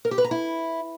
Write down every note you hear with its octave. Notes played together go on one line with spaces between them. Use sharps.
A#4
G4
B4
A#5
E4